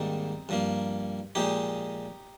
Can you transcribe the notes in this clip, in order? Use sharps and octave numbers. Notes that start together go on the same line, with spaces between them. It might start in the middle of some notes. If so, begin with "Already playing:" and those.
Already playing: G#2 D#3 G3 A#3 C4 D#4
G2 F3 A#3
A#2 F3 G#3 D#4 G4